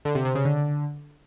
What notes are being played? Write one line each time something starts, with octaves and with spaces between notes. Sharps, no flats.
D3
C3
C3
C#3
D3